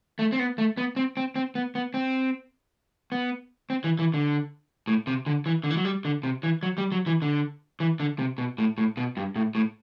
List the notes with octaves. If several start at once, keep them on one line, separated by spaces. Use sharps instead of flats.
A3
C4
B3
A3
B3
C4
C4
C4
B3
B3
C4
B3
C4
E3
E3
D3
A2
C3
D3
E3
D3
E3
F#3
G3
D3
C3
E3
F#3
G3
F#3
E3
D3
E3
D3
C3
B2
A2
A2
B2
G2
A2
A2